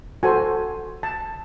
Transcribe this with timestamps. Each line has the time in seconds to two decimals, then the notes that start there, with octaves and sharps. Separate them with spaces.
0.23 F#4 A4 C5 G#5
1.03 A5